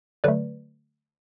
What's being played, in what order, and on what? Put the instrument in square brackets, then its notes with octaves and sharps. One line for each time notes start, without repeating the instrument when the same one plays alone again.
[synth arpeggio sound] D3 F#3 A3 B4 D5